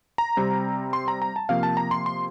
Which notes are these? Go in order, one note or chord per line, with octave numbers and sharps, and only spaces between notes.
A#5
C3 G3 C4
C6
A#5
A#5
A5
C3 F3 A#3 F5
A5
A#5
C6
C6